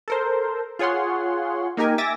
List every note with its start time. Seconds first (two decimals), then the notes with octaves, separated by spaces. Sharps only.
0.08 A4 A#4 C5
0.79 F4 G#4 C#5 F#5 C6
1.77 A#3 D#4 G4 A#4 G#5
1.98 E5 G#5 D6 A6 A#6